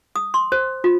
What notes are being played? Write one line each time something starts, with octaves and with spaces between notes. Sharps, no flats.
D#6
C6
C5
F4